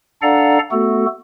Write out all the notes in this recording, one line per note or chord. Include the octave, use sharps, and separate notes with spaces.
D4 A4 D5 F5 F#5 A#5
A3 B3 F#4 A4